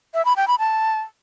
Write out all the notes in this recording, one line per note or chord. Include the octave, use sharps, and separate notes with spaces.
E5
B5
G5
B5
A5